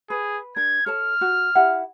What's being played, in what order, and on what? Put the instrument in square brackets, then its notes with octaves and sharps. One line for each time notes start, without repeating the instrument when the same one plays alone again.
[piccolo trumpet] G#4 [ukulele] B4
[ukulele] D4 A#4 [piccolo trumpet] G#6
[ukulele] A4 C#5 A5 [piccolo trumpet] F6
[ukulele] F#4
E4 G4 F#5